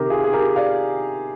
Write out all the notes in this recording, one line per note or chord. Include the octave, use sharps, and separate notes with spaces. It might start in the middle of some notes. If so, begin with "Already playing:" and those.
Already playing: C3 D#3 G4 A#4
F4 G#4
G#4
G4 A#4
D5 F5